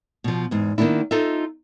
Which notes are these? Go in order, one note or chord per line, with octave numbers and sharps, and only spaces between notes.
B2 F3
E2 G#2
D#3 A#3 B3 D4 E4
D#4 F4 A4 D#5 E5